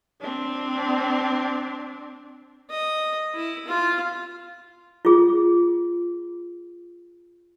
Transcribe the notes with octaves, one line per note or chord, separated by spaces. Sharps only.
C4 D4
D#5
E4
F4
F4 G#4